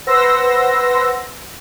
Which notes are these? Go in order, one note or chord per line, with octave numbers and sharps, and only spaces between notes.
B4 C5 F#5 C6 E6 A#6